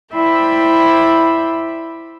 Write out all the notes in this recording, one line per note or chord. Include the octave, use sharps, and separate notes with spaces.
E4 C5 D5 E5 G5 B5